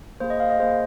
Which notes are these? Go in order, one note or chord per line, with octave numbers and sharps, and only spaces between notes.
A#3 G#4 C5
D#5
F5
D#5
A#3 G#4 C5